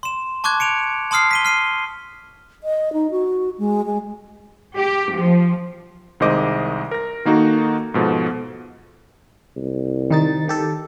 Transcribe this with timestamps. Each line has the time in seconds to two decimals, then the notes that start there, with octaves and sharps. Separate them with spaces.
0.03 C6 E7
0.44 A5 C#6 D6 F#6 G#6
0.60 C#7 D7 F7
1.11 A5 C6 D#6 F6 C7
1.31 B6 D#7 G7
1.45 F6 C7 D#7
2.64 D#5
2.93 D#4
3.11 F#4
3.58 G#3
3.86 G#3
4.77 G4
5.17 F3
6.20 C2 D#3 G#3 C5 D#5 D6
6.91 A#4 A#6
7.25 D#3 A#3 D#4 F#4 A4
7.94 G#2 B2 F3 A4
9.56 C2
10.10 D#3 D#4 A6
10.48 D#3 G4 A4